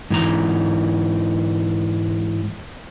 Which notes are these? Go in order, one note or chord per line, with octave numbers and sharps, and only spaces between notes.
G#2 E3 A#5